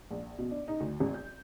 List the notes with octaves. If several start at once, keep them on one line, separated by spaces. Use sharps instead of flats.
A#1
B2
D4
D#4
D2
G#1
G6